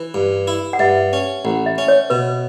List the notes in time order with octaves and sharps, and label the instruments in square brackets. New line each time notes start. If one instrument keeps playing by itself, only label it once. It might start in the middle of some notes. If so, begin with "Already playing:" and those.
Already playing: [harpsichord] E3
G2
E4
[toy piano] F#5
[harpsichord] G2 [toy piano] E5
[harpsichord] C#4
[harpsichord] A1 [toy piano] F#5
[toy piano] E5
[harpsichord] C#4
[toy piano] C#5
[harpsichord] B2 [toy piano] B4